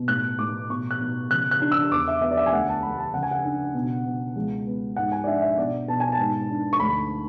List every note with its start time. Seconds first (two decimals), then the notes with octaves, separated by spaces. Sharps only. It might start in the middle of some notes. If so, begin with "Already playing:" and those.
Already playing: B2
0.08 A2 F#6
0.39 A2 D6
0.70 B2 C#6
0.91 F#6
1.00 B2
1.30 C#3 F#6
1.51 F#6
1.61 D4
1.72 E6
1.91 E2 D6
2.08 E5
2.22 B3 E5
2.31 D5
2.37 E5
2.46 G#5
2.52 D2 F#5
2.69 A5
2.83 A3 B5
2.98 A5
3.14 C#3 F#5
3.23 G#5
3.31 F#5
3.45 D4
3.74 B2
4.05 B2
4.36 C#2
4.66 B3
4.96 G#2 F#5
5.12 G#5
5.24 D5
5.27 D4 E5
5.42 E5
5.58 B2 D5
5.88 B2 A5
6.00 G#5
6.12 A5
6.18 G#2
6.50 D4
6.73 C#6
6.80 D2 B5